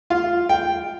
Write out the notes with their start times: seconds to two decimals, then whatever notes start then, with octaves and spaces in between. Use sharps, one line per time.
0.10 F4
0.49 G5